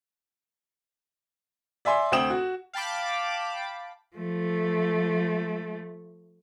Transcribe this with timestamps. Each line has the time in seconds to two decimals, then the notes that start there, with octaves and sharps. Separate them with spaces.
1.85 D5 E5 G#5 C6
2.12 D2 C4 G5 D#6 E7 F#7
2.30 F#4
2.73 F5 G5 A5 B5 D6
4.16 F3 A3